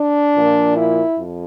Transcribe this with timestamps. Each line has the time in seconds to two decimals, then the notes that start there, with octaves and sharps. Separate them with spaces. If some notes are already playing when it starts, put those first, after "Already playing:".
Already playing: D4
0.35 A#2 F3 A#3
0.76 E4
1.17 F2